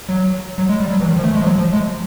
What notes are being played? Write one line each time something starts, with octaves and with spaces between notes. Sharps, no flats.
F#3
F#3
G#3
G3
F#3
E3
D#3
F3
A3
G#3
F3
F#3
F3
G#3